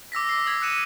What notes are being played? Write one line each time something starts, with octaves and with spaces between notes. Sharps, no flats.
D6 E6 A#6 B6
C7
D#6 G#6 B6
F#6 C7 C#7 D#7 E7